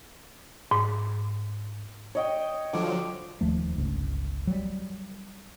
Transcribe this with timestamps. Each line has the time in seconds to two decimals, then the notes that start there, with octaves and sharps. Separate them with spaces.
0.71 G#2
2.15 C#5 D#5 G5
2.73 D3 F3 F#3 D6
3.41 D#1 D#2 F3 A3
3.78 G1 C#2
4.47 F#3 G3